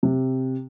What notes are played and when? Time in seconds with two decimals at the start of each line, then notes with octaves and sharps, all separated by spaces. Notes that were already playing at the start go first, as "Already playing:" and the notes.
0.03 C3